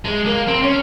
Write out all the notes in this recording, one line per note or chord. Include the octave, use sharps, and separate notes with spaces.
G#3
A#3
C4
C#4